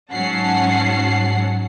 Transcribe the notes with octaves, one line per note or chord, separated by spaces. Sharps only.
G#2 F#3 C#4 F#5 A5 C7